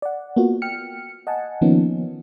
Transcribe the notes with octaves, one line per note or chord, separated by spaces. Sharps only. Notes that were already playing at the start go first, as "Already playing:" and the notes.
D5 F#5
A#3 B3 F4 F#4
G5 F6 C#7
D#5 F#5 G#5 A5
D#3 F3 A#3 B3 C#4 D#4